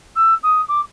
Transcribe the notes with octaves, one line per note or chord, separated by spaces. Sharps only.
E6
D#6
D6